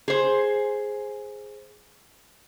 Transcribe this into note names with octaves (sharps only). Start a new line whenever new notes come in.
G#4 C5